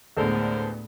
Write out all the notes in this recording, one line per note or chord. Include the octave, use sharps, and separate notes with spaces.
D2 A2 D3 G#3 B3 A4 A#4 C5